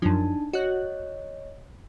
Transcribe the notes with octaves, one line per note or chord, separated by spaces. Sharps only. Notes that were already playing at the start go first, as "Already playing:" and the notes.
F#2 F3 D4 D#4 A5
F#4 C#5 D#5 F#6